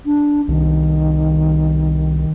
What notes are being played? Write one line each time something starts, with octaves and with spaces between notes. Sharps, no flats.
D4
C2 D#3